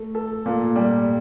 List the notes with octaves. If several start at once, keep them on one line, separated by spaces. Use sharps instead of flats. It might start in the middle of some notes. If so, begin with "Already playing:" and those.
Already playing: A3
A4
A#2
G3